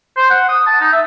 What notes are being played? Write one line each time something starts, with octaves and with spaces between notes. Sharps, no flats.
C5
F#5
D#6
A5
D#4
E5